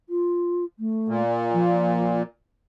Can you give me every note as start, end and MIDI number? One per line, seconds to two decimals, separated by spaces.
0.09 0.65 65
0.79 1.22 57
1.08 2.23 46
1.33 1.51 74
1.53 2.21 53